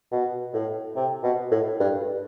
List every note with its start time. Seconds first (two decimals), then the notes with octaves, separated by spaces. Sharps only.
0.12 B2
0.54 A2
0.96 C3
1.23 B2
1.51 A2
1.80 G2